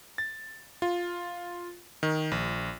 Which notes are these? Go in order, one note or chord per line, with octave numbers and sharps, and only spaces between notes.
A6
F4
D#3
A#1